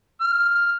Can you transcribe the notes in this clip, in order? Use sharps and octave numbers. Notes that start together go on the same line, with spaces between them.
F6